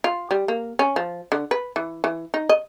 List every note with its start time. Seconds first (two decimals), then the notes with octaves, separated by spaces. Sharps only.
0.04 F4
0.31 G3
0.48 A#3
0.79 C#4
0.96 F3
1.32 D3
1.51 B4
1.76 E3
2.04 E3
2.34 D#4
2.49 D#5